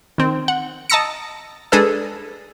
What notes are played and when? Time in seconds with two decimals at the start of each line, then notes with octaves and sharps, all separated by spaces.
0.18 D#3 C4
0.48 F#5
0.90 D#5 A5 A#5 E6 A#6 C#7
1.72 G#3 D4 G#4 A4 B4 E6